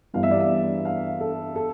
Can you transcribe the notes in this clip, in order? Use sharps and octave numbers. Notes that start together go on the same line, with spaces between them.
G1 G2 E3 G3 B3 F5
E5
D5
E5
F5
A4
A4